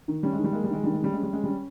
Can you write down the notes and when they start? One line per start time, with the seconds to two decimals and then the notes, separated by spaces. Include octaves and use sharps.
0.08 D#3
0.23 G3 C#4
0.33 G#3
0.39 D#3
0.44 G3
0.53 G#3 A#3
0.64 G3
0.70 D#3 G#3
0.83 D#3 G3
0.93 G#3
1.01 G3 C#4
1.13 G#3 C#4
1.23 G3
1.33 G#3 C#4
1.44 G3 C#4